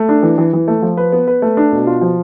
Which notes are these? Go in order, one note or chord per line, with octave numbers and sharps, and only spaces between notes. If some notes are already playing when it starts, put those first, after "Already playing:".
Already playing: A3
D4
E3
E3
E3
A3
F3
B4
B3
B4
A3
D4
B2
F4
F3